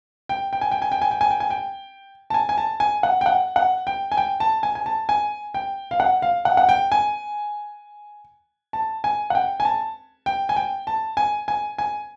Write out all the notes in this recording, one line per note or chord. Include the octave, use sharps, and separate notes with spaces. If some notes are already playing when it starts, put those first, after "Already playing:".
G5
G5
G#5
G5
G#5
G5
G#5
G5
G#5
G5
G#5
G5
A5
G#5
G#5
A5
G#5
F#5
G5
F#5
F#5
G5
G#5
G5
A5
G#5
G#5
A5
G#5
G5
F5
F#5
F5
F#5
F#5
G5
G#5
A5
G#5
F#5
G5
G#5
A5
G5
G#5
G5
A5
G#5
G#5
G#5